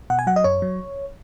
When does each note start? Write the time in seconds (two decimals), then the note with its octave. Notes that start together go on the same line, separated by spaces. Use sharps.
0.10 B2 F#5
0.19 G#5
0.27 F#3 F#5
0.36 D#5
0.44 F#2 C#5
0.62 F#3